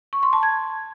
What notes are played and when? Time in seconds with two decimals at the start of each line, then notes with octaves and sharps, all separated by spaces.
0.13 C#6
0.23 C6
0.33 A5
0.43 G#6